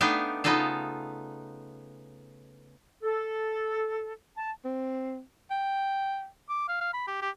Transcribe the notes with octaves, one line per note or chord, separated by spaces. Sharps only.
A3 B3 D4 D#4 F5 G5
C#3 B3 D#4 F4 A4 F5
A4
A5
C4
G5
D6
F5
F5
B5
G4
G4